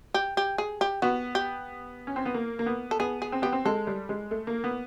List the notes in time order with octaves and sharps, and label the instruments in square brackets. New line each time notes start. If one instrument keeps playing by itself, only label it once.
[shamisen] G4
G4
G#4
G4
[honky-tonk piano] B3 [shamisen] F#4
[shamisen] G4
[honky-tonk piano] C#4
C4
B3
A#3
A#3
B3
[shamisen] A4
[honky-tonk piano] B3 [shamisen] G#4
[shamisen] G#4
[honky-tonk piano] C4
[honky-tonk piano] B3 [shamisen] G4
[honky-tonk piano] C4
[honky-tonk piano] G#3 [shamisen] A4
[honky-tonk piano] G3
G#3
A3
A#3
B3